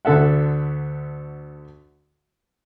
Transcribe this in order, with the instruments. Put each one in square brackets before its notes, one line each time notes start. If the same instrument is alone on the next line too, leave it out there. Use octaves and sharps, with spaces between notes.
[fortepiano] D2 D3 A4 E5 F#5